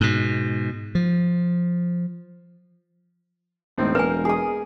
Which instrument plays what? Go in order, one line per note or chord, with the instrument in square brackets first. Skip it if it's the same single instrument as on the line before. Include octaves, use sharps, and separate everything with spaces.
[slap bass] G#2 B2
F3
[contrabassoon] E1 [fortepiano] A2 C4 D#4
[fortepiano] A#3 [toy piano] B4 G#5
[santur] G#4 D#6